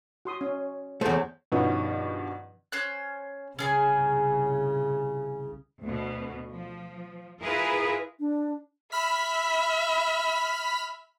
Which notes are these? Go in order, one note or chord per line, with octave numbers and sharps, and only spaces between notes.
F#4 C6 D#6
C#4
E2 A3 C5 C#5
G2 B2 D#3 F3 B3 C#4
C#4 C5 F#6
C2 C#3 C#4 G#4 G#5
D2 B2
F3
E4 F4 G#4 A#4 B4
D4
E5 B5 F6 B6